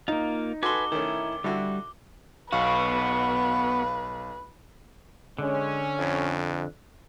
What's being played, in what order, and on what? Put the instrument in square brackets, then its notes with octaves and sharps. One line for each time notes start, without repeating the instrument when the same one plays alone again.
[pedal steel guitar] A#3 F4 [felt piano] D#4
[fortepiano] F#4 A4 C6 [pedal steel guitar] B4 G#5 [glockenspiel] D6 G7
[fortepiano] D#3 A3 C#4 [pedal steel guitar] E4
[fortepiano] D3 E4 F#4 [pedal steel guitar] G3
[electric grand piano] B1 F5 [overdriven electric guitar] B3 F#4 [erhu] B4
[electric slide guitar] D3 [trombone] G#3 [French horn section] C#4
[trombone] F2